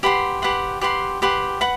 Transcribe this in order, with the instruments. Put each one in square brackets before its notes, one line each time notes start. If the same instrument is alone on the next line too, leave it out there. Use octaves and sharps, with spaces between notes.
[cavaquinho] G4 B4 F#5 C6
G4 B4 F#5 C6
G4 B4 F#5 C6
G4 B4 F#5 C6
B4 F#5